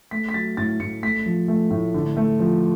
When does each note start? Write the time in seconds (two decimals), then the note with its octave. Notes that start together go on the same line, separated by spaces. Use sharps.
0.11 A3 B6
0.29 B6
0.34 F#3 A6
0.57 A2 A6
0.80 A2 C#7
1.03 A3 B6
1.26 F3
1.48 A3
1.70 A2
1.94 D3
2.17 A3
2.40 F3